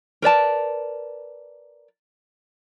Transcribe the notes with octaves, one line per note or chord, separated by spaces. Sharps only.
A#4 B4 D5 A5